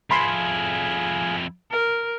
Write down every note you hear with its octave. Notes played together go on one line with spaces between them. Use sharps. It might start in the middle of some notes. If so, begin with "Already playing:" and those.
F2 E4 G#4 F5 G#5 B5 C6
A#4